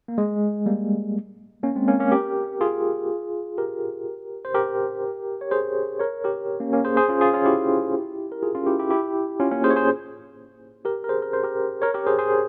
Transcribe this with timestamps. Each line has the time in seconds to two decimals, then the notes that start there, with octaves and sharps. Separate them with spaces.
0.08 A#3
0.18 G#3
0.66 G3 A#3
1.63 A#3 C#4
1.76 G#3 C4
1.88 A#3 C#4
2.00 A#3 C#4
2.11 G4 A#4
2.61 F4 G#4
3.58 G4 A#4
4.45 C5
4.54 G4 A#4
5.41 C#5
5.51 G#4 C5
5.99 A#4 C#5
6.24 G4 A#4
6.60 A#3 C#4
6.73 A#3 C#4
6.85 G#4 C5
6.97 G#4 C5
7.09 C#4 F4
7.21 F4 G#4
7.33 C#4 F4
7.45 E4 G4
8.32 A#4
8.42 F4 G#4
8.55 C#4 F4
8.66 E4 G4
8.79 E4 G4
8.91 E4 G4
9.40 C#4 F4
9.51 A#3 C#4
9.64 G#4 C5
9.70 C#5
9.76 G#4 C5
10.85 G4 A#4
11.04 A#4
11.09 G#4 C5
11.22 A#4
11.33 C5
11.43 G4 A#4
11.82 A#4 C#5
11.94 G4 A#4
12.07 G#4 C5
12.19 G#4 C5